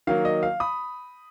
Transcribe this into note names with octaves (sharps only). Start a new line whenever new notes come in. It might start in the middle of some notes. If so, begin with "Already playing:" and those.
D#3 F#3 A#3 F5
D#5
F5
B5 D#6